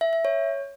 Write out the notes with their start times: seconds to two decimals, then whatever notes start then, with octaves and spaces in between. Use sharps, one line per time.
0.01 E5
0.13 E5
0.25 C#5